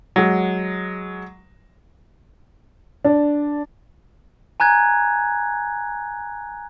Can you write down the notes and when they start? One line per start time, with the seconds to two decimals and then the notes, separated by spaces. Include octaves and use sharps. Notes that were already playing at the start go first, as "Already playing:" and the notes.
0.16 F#3 G#3
3.05 D4
4.60 G#5 A#5 F#6 G#6